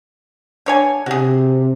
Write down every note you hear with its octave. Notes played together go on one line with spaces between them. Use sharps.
D3 C#5 G#5
C3 F#4 G#4